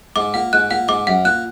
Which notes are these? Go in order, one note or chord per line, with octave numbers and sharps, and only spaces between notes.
G#2 D6
A#2 F#5
G#2 F#6
A#2 F#5
G#2 D6
F#2 F#5
A#2 F#6